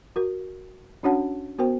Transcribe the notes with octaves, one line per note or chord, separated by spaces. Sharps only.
F#4 A#4
C#4 D4 F#4 C#5 F#5 A5
B3 F#4 A#4 C5 G5